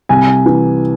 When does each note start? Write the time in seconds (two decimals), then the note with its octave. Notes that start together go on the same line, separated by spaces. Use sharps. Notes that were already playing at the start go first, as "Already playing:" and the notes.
0.09 C2 G#5
0.46 E3